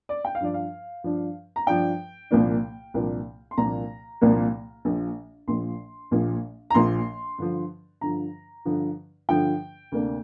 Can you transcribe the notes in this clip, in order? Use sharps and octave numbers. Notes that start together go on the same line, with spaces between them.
D5
G5
F5
G2 F3 D4 D5
F5
G2 F3 D4
A#5
G2 F3 D4 G5
C2 A#2 F3 A#3 D4
C2 A#2 F3 A#3 D4
C6
C2 A#2 F3 A#3 D4 A#5
C2 A#2 F3 A#3 D4
A#1 A#2 F3
A#1 A#2 F3 C6
A#1 A#2 F3
A#5
A#1 A#2 F3 C6
G2 D3 F3
G2 D3 F3 A#5
G2 D3 F3
G2 D3 F3 G5
D2 C3 A#3 D4